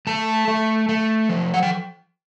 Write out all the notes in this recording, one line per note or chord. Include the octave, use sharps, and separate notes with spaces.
A3 A5
A3
A3
F3
F#5
G5